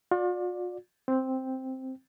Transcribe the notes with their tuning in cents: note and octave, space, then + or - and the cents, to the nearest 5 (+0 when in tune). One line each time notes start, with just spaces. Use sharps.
F4 +45 D5 +5
C4 +0 G5 +0